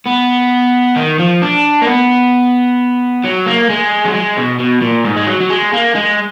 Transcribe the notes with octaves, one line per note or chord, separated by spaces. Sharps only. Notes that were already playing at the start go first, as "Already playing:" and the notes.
B3
D#3
F3
D4
A#3
B3
F#3
A#3
G#3
F#3
G#3
B2
B2
A#2
G#2
G#3
F#3
F#3
G#3
A#3
G#3